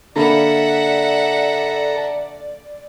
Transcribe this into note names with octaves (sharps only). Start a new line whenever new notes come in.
D3 A#3 A4 D5 E5 F#5 A#5 B5